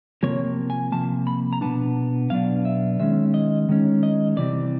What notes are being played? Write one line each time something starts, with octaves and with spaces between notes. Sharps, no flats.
C3 F3 A#3 C#5
G#5
C3 F3 A#3 A5
B5
A#5
B2 F#3 B3 D4 A5
B2 F#3 B3 D4 F5
E5
D#3 G#3 C#4 E5
D#5
D#3 G#3 C#4
D#5
C3 E3 G3 C4 D5